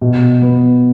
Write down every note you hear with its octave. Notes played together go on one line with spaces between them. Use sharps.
B2
B3